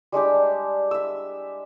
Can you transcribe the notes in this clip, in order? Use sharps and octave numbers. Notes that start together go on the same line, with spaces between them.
G3 G#3 D4 G4
E5 E6